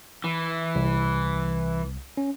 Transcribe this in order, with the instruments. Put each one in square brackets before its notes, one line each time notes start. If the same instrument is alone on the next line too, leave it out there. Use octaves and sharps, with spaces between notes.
[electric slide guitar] E3
[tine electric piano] C2
C#4